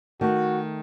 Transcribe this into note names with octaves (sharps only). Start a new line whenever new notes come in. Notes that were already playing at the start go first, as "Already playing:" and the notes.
D#3 A3 F#4